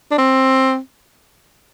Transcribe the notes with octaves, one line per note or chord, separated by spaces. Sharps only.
D4
C4